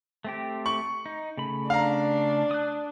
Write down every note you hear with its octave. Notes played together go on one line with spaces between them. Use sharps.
A3 C4 G4
C#6 F#7
D#4
C#3 A3 B5
D4 F5 A#5
D#6 F#6